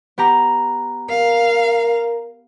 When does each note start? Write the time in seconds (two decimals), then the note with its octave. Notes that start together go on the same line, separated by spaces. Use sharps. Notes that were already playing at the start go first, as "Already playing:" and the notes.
0.18 B3 G4 A#5
1.10 A#4 F5